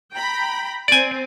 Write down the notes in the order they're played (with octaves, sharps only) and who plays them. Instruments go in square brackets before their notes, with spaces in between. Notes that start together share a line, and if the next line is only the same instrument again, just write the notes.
[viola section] G5 A#5 B5
[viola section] C4 [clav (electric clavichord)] D5 G#5